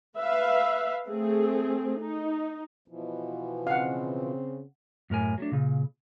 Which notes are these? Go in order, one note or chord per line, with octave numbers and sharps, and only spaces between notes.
B4 E5 F5
A3 C4 G#4
D#4
B2 E3 F3
C#3 C4 F5 F#5
F#2 A2 A#4 G#5
F#3 A3 D4
A#2 C#3